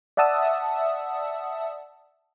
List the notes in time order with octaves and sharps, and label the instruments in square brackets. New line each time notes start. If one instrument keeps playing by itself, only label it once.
[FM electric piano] D5 E5 F#5 A5 D#6 E6